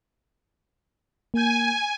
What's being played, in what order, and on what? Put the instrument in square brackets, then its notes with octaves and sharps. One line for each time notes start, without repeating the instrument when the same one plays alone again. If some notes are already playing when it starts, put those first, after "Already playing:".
[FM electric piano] A#3 G6 [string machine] G#5